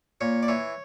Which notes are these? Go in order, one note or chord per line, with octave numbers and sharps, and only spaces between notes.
A#2 C#5
D5
E3 C#5